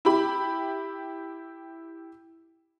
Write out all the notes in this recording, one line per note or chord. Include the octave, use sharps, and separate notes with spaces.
E4 G4 B5